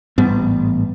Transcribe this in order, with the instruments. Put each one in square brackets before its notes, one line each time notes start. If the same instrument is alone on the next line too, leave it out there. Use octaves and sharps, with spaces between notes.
[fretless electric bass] A1 G#2 G3 B3